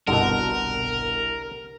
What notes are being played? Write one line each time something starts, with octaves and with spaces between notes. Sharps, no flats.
G1 C2 B2 D3 A4 A#4 F#5